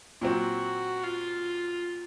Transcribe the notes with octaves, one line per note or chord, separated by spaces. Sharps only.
A#2 F#3 C4 F#4
F4